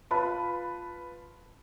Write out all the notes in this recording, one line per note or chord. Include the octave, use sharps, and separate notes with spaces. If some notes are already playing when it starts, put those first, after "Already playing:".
F4 B4 A5 B5